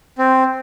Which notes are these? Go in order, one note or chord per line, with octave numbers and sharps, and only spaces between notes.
C4